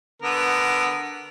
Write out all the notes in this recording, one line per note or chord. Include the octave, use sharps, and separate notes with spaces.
D3 B3 A#4